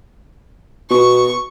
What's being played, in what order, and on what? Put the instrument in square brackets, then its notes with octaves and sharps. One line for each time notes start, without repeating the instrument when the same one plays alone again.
[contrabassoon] B2 [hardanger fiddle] C#6